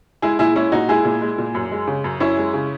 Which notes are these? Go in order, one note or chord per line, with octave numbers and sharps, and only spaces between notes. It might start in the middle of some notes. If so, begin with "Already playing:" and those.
G#3 E4 G#4
A#2 E4 G#4
G#3 C#4 E4
A#2 D#4 F#4
G#3 E4 G#4
A#2
G#3
A#2
F#2
G#3
C#3
F#2
F#2 C#4 E4
G#3
C#3